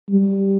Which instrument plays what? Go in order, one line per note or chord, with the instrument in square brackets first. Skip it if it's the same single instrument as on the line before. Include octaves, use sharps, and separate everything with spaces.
[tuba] G3